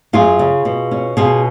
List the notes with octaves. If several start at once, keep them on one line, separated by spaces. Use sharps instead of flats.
F#2 F4 G#4
C#3
B2
C#4
B2 F4 G#4